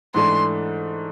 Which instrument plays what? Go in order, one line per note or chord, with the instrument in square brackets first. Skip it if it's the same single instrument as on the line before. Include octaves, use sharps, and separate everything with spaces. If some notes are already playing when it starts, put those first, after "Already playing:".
[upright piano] G#2 E3 A3 D4 [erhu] C6